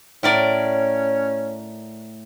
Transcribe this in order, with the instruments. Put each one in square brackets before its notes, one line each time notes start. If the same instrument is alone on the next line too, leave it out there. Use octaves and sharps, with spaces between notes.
[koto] A2 A#4 D5 [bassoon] C#4